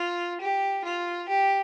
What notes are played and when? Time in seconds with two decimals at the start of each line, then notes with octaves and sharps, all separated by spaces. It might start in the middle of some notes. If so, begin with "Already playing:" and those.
Already playing: F4
0.41 G4
0.84 F4
1.28 G4